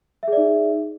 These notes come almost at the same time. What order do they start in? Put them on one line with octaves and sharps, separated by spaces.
E5 G#4 D5 D#4